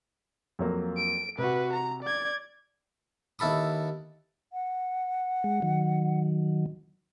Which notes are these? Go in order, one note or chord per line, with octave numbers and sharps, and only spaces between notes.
F2 F#3 A#3
D7
C3 F#4 B4
A#5
D5 G#6
D#2 E4 A4 B5 D#6
F#5
G#3
D#3 F#3